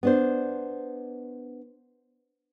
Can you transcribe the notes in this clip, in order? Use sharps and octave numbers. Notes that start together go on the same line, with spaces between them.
B3 D4 C5